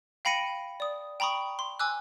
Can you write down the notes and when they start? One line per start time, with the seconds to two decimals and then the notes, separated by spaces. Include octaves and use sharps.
0.25 F5 G5 B5 A#6 C#7 D#7
0.80 D5 D#6
1.20 G5 A#5 B5 C#6 D#6
1.59 C6
1.79 G#5 D6 E6 F#6